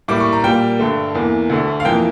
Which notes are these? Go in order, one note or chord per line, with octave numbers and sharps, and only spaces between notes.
A2 G3 A#3 D6
C#6
A#5
A#2 G3 A#3 G5
G2 D3 A3
E2 E3 A#3
D2 D3 A3
F5
F2 E3 A#3 G5